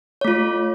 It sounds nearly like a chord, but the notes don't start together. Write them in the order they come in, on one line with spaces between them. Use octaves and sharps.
C#5 A3 F4